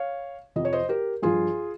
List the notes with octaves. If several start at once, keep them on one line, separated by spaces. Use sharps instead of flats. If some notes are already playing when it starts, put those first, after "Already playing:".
Already playing: C#5 F5
F2 C3 F3 D#5
C#5
C5 D#5
G4 A#4
G2 F3 F4 G#4